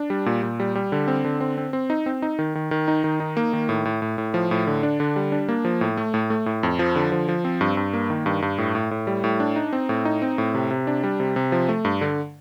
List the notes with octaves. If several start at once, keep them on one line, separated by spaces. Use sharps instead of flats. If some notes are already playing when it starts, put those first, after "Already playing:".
Already playing: D4
G3
A#2
A#2
G3
G3
D3
C4
D3
C4
C4
C4
D#4
C4
D#4
D#3
D#3
D#3
D#4
D#3
D#4
A#3
D#3
A2
A2
A2
A2
F3
A2
D3
D4
D3
G3
D4
A#3
F3
A2
A3
A2
A3
A2
F2
F3
D3
F3
F3
C4
G2
G2
A#3
D#3
G2
G2
A2
A2
A2
G3
A2
D4
D#4
C4
A2
D#4
C4
A2
C3
C3
D4
G3
C3
C3
F3
A3
G2
D3